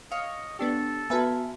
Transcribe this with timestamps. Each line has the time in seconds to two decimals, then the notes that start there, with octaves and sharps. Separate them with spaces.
0.12 C#5 D#5 F5
0.59 B3 D4 G4 A4
1.10 B3 F#4 B4 E5 G#5 A5